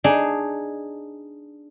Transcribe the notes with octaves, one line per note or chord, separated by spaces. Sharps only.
D4 D#4 G#4